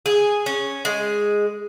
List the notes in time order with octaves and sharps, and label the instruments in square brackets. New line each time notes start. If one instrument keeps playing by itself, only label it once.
[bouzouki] G#4
C#4
G#3